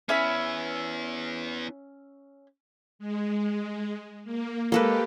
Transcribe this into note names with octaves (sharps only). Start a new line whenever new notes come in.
B3 C#4 E4 E5 B5
G#3
A#3
G#3 A#3 G4 A4 B4